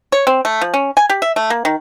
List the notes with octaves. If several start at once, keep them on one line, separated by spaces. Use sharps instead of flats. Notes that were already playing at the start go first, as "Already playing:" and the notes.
C#5
C4
A3
F3
C#4
G#5
G4
E5
A3
A#3
D#3